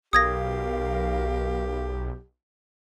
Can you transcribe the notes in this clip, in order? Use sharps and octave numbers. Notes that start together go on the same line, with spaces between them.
B1 G4 A#4 F5 D#6 G#6 A#6